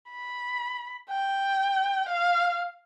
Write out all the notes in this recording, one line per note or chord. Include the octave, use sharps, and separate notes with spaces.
B5
G5
F5